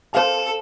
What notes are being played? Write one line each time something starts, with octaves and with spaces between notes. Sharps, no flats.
A4 C5 F5 A5